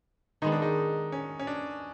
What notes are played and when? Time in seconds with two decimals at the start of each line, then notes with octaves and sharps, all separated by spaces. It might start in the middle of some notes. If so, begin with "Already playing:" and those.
0.42 D#3 G#3 B3 D#4
0.52 D4
0.62 D#4
1.12 C#4
1.39 C#4
1.47 D4